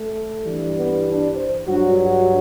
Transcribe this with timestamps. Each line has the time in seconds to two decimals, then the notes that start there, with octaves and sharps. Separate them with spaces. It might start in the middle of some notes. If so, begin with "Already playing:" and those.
Already playing: A3
0.44 G2 E3 G3
0.75 B3
1.06 D4
1.36 C5
1.67 G2 F#3 F#4
1.98 F#4